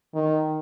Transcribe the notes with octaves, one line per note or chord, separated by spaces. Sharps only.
D#3